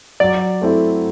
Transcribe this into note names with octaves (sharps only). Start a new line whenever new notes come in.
F#3 D5
A3 C4 E4